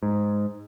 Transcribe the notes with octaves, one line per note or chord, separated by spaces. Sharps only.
G#2